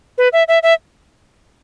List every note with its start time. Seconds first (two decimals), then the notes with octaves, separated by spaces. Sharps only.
0.18 B4
0.33 E5
0.48 E5
0.63 E5